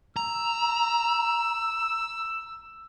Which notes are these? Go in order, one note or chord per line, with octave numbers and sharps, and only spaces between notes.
A#5 E6